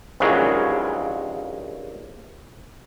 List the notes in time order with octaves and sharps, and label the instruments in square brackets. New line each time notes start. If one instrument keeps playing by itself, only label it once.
[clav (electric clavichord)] A#1 D#2 C#3 E3 F#3 G#3